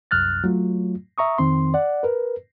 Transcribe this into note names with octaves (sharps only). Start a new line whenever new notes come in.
C2 F#2 F6 F#6 A6
F#3 A3 F4
E5 A#5 C#6 D#6
F2 D#3 C4 C6
D5 F#5
A#4 B4